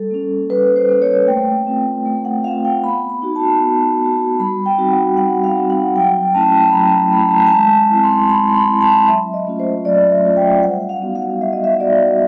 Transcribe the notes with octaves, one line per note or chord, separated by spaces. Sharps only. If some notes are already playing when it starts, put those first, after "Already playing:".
Already playing: G3 A4
A#3 C#4
G3 B4
C5
A#3 C#4
C#5
A3 G5
C4 F4
A3
F#5
C4 F4 F5
G5
B3 B5
B5
D#4 F#4
A5
B3
D#4 F#4
G3 B5
G5
C4 D#4 F#4
F#5
G3 F#5
F5
C4 D#4 F#4
F#5
F#3 G5
A3 C#4 E4 A5
B5
F#3 A#5
A3 C#4 E4 B5
A5
A#5
G#5
G#3 A5
C4 E4
C6
G#3 B5
C6
B5
C4 E4
A5
F#3 E5
D#5
A3 C#4 F4
C5
F#3 D5
E5
A3 C#4 F4
G5
G3 F#5
F5
B3 D#4 F#4
F5
G3 E5
D#5
E5
B3 D#4 F#4 D5